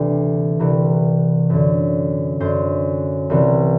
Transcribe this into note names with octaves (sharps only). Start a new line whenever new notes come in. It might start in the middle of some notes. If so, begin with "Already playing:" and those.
Already playing: D2 C3 E3
C2 C3 E3
F#2 D3
F#2 D3 C5
C2 C3 E3